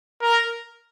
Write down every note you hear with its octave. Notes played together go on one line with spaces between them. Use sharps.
A#4